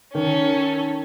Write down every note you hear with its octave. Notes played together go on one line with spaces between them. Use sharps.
D#3 C#4 A4